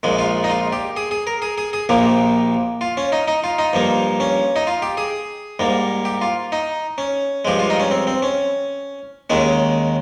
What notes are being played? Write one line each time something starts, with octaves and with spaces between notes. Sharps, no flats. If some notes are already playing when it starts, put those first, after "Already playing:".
A#1 A#2 G#3
F4
D#4
F4
G4
G#4
G#4
A#4
G#4
G#4
G#4
A#1 A#2 F3 A#3 G4
F4
C#4
D#4
D#4
F4
D#4
G2 F3 A#3
C#4
D#4
F4
G4
G#4
G#2 G3 A#3
G4
F4
D#4
C#4
G2 F3 G#3 G4
F4
D#4
C#4
C4
C4
C#4
D#2 D#3 G#3 C#4